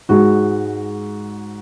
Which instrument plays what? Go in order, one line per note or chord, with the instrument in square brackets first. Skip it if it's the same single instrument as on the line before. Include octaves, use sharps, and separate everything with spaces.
[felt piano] G#2 G#3 F#4